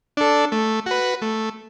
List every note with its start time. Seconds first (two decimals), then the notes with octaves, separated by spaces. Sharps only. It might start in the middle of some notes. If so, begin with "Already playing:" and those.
0.17 D4 A4
0.52 A3
0.86 F#4 B4
1.22 A3